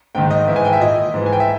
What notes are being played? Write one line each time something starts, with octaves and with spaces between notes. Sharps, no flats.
G#2 D#3 G5
D#5
G#2 E3 E5
G#5
G5
E5
A#2 D#5
G#2 E3
G#5
G5
E5